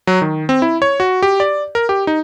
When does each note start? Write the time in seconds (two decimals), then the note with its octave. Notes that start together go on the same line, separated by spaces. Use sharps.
0.07 F#3
0.22 D#3
0.49 C4
0.62 E4
0.82 C#5
1.00 F#4
1.23 G4
1.40 D5
1.75 A#4
1.89 G4
2.07 D#4